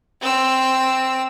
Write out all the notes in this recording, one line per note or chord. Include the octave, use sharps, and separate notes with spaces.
C4 E6